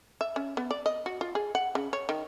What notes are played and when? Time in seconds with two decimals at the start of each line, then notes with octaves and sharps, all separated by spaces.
0.21 E5
0.36 C#4
0.57 B3
0.71 D5
0.86 D#5
1.06 F#4
1.21 F4
1.35 G#4
1.55 F#5
1.75 C#3
1.93 C#5
2.09 D#3